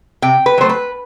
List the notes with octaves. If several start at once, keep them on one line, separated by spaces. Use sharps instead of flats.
C3 G5
B4
F#3 A3 C5
B4